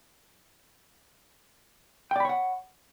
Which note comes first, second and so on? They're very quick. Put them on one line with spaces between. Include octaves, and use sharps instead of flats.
G5 D5 B5 C#5 F#5